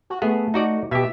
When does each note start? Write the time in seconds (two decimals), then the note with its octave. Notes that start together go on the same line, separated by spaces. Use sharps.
0.10 F#4
0.22 A3 B3 G#4
0.54 D#4 F#4 D5
0.91 B2 G4 E5